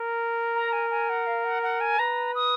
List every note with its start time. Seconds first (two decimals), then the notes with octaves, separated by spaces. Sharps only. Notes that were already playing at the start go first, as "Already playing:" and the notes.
Already playing: A#4
0.56 A#5
0.73 G#5
0.90 G#5
1.09 F#5
1.27 F5
1.44 F#5
1.63 F#5
1.81 G#5
1.99 B4 A#5
2.35 D#6